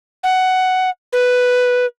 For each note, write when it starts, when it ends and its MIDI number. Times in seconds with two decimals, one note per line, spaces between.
0.23 0.90 78
1.13 1.86 71